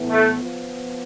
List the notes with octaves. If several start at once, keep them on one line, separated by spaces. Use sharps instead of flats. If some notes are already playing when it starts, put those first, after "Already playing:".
Already playing: A2 E3 B3
A3
F3 B3 F4